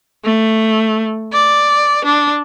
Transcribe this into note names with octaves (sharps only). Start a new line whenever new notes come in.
A3
D5
D4